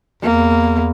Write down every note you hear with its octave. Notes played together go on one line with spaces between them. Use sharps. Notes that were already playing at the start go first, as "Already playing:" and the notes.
E2 A#3